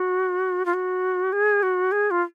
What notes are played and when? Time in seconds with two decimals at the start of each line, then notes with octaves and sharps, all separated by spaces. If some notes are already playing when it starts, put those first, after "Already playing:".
Already playing: F#4
0.66 F4
0.74 F#4
1.33 G#4
1.63 F#4
1.92 G#4
2.11 F4